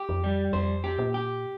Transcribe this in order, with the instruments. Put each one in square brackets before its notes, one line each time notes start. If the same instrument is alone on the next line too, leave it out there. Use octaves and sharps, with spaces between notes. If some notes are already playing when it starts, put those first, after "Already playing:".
Already playing: [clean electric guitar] G4
[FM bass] F2
[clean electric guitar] G3
[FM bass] F2 [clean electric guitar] C5
[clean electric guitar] G4
[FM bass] A#2
[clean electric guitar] G4